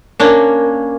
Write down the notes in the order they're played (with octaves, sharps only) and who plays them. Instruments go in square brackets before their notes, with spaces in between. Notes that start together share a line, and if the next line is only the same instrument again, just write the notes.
[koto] A#3 C#4 D4